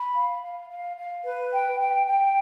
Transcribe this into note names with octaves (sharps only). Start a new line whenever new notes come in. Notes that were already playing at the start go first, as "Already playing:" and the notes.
Already playing: B5
F5
F5
F5
F5
B4
G5
G5
G5